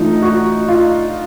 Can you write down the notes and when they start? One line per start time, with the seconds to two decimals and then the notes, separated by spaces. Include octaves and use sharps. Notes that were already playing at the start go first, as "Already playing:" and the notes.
Already playing: E3 A3 D4 D#4 F4
0.22 F#4
0.68 F4